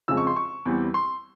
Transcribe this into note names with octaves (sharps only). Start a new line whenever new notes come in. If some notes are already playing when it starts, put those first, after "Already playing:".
F2 C#3 F3 G#3 C4 E6
C#6
C6
C#6
E2 E3 G3 C4
C6